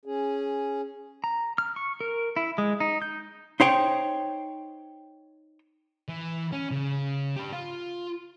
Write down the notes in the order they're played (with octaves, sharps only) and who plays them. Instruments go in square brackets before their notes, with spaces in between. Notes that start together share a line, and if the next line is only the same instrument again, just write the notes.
[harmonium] C#4 G#4
[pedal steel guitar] A#5
F6
C#6
A#4
E4
G#3
D#4
G6
[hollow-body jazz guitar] D#4 C5 C#5 G5
[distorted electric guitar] E3
C#4
C#3
G4 B4
F4